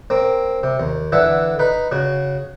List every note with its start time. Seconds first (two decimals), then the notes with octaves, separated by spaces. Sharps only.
0.10 A#3 C4
0.63 C3
0.80 D#2
1.12 D3 E3 A4 E5 F#5
1.59 D#4 B4 B5
1.92 C#3 F#4